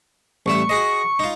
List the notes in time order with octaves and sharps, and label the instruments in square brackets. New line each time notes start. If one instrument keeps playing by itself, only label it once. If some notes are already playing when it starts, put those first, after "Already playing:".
[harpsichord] A1 G3 E5 [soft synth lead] C#6
[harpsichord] F#4 G#4 D#5
D#4 F4